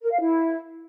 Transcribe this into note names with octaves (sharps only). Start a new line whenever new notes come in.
A#4
F5
E4